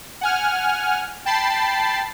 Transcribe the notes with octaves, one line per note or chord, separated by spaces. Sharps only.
F#5 G#5 F6
G5 A5 B5 A6 C7